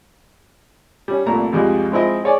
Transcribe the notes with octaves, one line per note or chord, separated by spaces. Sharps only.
G3 C#4
C2 A#2 A3 A#5
C2 F2 G3 G#3
F3 G#3 C4 E4 D#5
G#4 C#5 D5 G#5